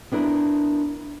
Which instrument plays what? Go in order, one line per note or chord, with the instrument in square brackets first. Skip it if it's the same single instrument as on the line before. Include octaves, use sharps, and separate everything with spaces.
[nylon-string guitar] B3 D4 E4 A#4